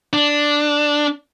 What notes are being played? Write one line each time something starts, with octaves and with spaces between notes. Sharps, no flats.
D4